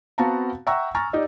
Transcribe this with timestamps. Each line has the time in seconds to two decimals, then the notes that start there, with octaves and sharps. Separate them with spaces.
0.18 B3 C4 F#4 F5 A5 A#5
0.67 E5 F#5 G5 A#5 C#6 E6
0.95 G#5 A#5 C#6 F6 A6
1.13 D#4 G4 D5 D#5